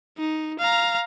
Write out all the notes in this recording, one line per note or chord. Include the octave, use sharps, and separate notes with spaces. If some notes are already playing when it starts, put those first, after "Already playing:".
D#4
F5 A#5